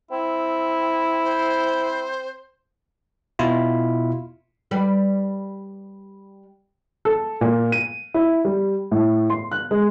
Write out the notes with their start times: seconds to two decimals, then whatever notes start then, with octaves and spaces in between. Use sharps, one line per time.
0.11 C4 E4
1.24 C5
3.39 B2 E4 F4
4.71 G3 B4 D5
7.05 A4
7.41 A#2
7.72 D#7
8.14 E4
8.45 G3
8.91 A2
9.30 C6
9.52 F#6
9.71 G#3